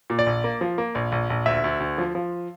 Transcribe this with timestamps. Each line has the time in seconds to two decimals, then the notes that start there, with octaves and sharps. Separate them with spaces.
0.10 A#2
0.19 D5
0.26 A#1
0.44 A#3
0.61 F3
0.78 A#3
0.95 A#1
1.12 A#1
1.30 A#1
1.46 D2 E5
1.64 D2
1.80 D2
1.98 F3
2.15 F3